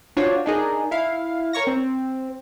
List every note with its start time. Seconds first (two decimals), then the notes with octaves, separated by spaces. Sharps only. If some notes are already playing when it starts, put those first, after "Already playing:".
0.17 D4 F4 F#4 C5 C#5
0.46 D4 D#4 G#4 A#4
0.91 E4 F5
1.53 A#4 C#5 C#6 A#6
1.67 C4